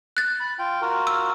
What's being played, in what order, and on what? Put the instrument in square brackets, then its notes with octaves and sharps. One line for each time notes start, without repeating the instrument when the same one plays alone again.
[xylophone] F#6 A6
[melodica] B5
F4 G5
F4 F#4 A#4
[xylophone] E6